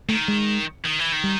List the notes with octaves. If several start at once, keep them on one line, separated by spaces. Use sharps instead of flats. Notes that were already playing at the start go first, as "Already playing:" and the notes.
D#3 A3
G#3
D#3
E3
D#3
G3